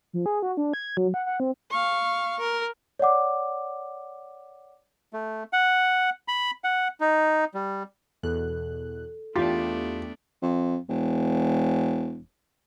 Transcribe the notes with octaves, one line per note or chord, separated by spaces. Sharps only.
F3
G#4
F#4
D4
G#6
F#3
F#5
F#5
C4
F5 C#6
A#4
C#5 D5 F#5 D6
A3
F#5
B5
F#5
D#4
G3
E2 B2 A4 F#6
E2 A3 B3 D4 F4 G4
F2
E1